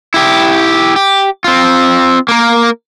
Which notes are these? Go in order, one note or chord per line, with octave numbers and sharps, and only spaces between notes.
E4 G4
G4
C4 F4
A#3 A#4